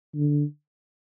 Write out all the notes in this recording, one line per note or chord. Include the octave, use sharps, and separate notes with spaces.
D3